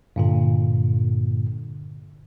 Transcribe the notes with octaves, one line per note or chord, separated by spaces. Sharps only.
G2 A#2 D3